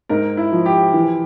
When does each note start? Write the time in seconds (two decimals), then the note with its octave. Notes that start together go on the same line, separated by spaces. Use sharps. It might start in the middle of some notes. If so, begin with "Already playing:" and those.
0.09 G#2 A#4
0.37 E4
0.52 F3
0.66 G4
0.94 E3